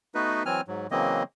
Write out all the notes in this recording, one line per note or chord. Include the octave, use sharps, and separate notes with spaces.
A3 B3 D#4 F#4 B4
E3 F#3 C4 G#5 F6
G#2 F#3
C#3 E3 F#3 A#3 C4 D#5